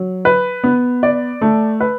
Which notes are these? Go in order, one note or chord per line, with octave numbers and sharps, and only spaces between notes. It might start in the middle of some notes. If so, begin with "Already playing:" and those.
Already playing: F#3
B4
B3
D5
A3
B4